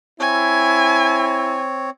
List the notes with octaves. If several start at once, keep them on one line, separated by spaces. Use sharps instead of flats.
C4 E4 C#5 G#5